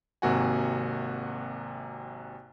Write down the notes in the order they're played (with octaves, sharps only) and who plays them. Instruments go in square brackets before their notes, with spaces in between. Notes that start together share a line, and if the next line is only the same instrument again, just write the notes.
[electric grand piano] G#1 C3 A#3 F#4 F#5 G#5